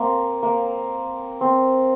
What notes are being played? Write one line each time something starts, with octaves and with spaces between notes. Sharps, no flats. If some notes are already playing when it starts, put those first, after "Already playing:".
Already playing: A#3 C4
A#3
C4